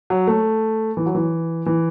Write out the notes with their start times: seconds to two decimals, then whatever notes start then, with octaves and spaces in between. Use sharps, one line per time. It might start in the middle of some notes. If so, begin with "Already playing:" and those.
0.10 F#3
0.27 A3
0.97 E3
1.06 F#3
1.15 E3
1.66 E3